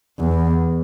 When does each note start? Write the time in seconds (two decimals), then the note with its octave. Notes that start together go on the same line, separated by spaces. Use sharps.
0.19 E2